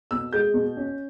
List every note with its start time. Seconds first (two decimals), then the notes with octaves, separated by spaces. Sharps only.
0.11 B2 E6
0.33 G#3 G6
0.54 B2
0.77 C#4